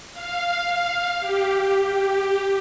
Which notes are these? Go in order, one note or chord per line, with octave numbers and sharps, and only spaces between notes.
F5
G4